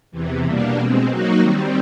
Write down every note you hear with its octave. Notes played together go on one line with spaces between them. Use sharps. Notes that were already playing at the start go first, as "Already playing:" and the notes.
E2 C3 E3
B2 G3 A#3 D4
B2 G#3 C4
F#3 A#3 D#4 F#4
D#3 G3 C4